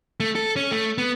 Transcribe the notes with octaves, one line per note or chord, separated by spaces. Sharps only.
A3
A4
C#4
A3
B3